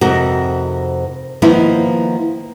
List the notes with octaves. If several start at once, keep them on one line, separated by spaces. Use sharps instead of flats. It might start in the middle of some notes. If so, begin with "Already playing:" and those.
F2 C3 D#4 F#4 A#4
D#3 F3 A#3 B3 D#4 E4